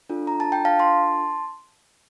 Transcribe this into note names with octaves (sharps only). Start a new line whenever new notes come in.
D4 F4 A4
A#5
A5
G5
F5 A5
A5 C6